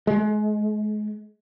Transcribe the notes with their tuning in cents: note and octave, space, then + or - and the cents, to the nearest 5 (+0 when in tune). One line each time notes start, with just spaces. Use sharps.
G#3 +35